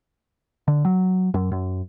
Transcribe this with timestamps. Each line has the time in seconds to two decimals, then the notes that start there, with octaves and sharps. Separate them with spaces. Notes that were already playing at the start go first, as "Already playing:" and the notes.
0.68 D3
0.85 F#3
1.34 F#2
1.52 F#2